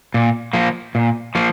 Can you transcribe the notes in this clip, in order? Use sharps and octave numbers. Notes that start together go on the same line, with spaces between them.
A#2
F3 A#3
A#2
F3 A#3